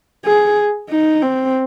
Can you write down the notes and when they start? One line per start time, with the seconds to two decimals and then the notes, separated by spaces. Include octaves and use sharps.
0.25 G#4
0.90 D#4
1.22 C4